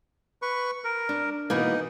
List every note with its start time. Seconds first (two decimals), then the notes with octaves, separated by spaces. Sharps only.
0.42 B4 C#6
0.84 A#4
1.09 D4
1.50 B2 E3 A#3 D#4